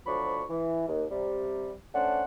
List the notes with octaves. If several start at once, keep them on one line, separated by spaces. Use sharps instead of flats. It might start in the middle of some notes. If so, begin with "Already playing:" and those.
D2 F3 F#3 D4 B5 C#6
E3
D#2
C3 G3
A3 C#4 D4 C5 F#5